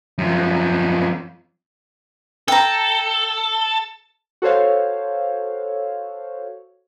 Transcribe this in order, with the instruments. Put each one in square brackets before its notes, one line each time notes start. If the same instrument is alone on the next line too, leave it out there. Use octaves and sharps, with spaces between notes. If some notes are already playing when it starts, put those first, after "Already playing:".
[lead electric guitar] F#2 F3
[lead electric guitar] A4 [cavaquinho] G5 A#5
[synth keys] F#4 A4 C5 C#5 F5